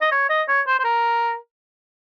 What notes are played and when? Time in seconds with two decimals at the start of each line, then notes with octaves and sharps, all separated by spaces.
0.01 D#5
0.12 C#5
0.29 D#5
0.48 C#5
0.67 C5
0.79 C5
0.84 A#4